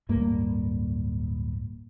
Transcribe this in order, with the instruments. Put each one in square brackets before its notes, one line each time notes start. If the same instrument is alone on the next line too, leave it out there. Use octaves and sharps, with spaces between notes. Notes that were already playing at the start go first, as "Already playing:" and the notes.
[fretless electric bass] D1 G2 A#3